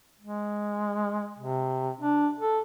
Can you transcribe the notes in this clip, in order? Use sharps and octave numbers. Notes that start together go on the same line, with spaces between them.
G#3
C3
D4
A4